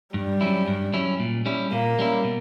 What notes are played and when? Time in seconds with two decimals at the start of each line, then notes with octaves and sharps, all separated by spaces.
0.14 G2 G3
0.41 F#3 C#4 E4
0.68 G2
0.93 F#3 C#4 E4
1.20 A#2
1.46 G3 C#4 E4
1.72 A#2 A#3
1.99 G3 C#4 E4
2.24 B2